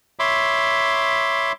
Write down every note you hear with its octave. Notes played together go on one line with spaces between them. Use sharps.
C#5 E5 B5 C6 D6